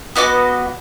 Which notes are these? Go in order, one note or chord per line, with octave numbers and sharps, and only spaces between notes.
B3 F#4 D#5 D6